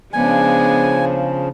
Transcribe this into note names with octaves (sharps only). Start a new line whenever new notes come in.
C#3 F3 G#3 B3 D4 G#5